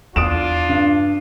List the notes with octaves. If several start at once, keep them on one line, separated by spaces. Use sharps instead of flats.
E2 D4 F4 D#6 D7 E7
G2